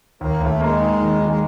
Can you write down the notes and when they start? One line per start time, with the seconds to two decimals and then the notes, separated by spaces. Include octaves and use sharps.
0.21 D#2 A#3
0.40 D#2 A3
0.60 G#3 A#3
0.80 D#4
1.00 D#3
1.20 D#3
1.29 G#3